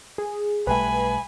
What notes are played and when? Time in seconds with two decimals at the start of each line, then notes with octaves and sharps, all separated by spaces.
0.18 G#4
0.67 B1 G3 A3 B4 G#5 B5